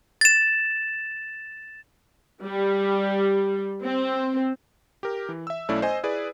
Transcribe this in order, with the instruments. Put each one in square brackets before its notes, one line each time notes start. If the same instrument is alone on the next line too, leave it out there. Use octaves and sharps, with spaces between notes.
[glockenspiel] A6 E7
[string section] G3
C4
[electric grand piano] G4 A#4
E3
E5 E6
B1 A3 C#4 E4 D5
C5 D#5 G#5
E4 G#4 B4 D5